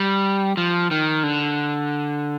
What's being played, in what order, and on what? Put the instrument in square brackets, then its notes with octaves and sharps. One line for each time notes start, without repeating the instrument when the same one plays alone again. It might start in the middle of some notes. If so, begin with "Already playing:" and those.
Already playing: [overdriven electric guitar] G3
F3
D#3
D3